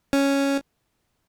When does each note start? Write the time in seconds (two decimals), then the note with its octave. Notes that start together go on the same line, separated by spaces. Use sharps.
0.13 C#4